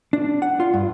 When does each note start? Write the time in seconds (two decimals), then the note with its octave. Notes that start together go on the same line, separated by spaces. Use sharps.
0.13 D4
0.42 F#5
0.60 F4
0.74 G2